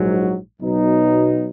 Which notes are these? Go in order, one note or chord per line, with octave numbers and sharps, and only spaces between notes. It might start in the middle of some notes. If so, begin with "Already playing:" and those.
Already playing: A#1 G#2 F#3
B1 B2 F#3 B3 D#4